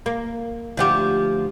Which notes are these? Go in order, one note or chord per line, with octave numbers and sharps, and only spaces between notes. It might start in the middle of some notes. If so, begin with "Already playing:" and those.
A#3
D2 F3 G4